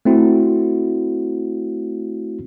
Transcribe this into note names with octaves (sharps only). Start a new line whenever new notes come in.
A3 C4 E4 F#4